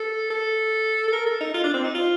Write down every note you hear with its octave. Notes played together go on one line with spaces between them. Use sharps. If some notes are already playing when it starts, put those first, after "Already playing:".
Already playing: A4
A4
A4
A#4
A4
D#4
F4
D4
C4
D#4
F4